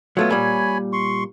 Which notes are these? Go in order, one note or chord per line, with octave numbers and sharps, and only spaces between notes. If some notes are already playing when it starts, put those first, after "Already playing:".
F#3 A3 B3 F4 C#5
A#2 G3 C#5 G#5 B5
C6 C#6